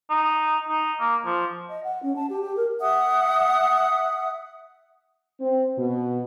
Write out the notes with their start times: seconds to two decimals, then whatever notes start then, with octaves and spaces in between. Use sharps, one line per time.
0.10 D#4
0.68 D#4
1.00 A#3
1.25 F3
1.69 D#5
1.84 F#5
2.03 C#4
2.16 A5
2.30 G4
2.42 G4
2.57 A#4
2.80 E5 F#5 D#6
5.41 C4
5.78 B2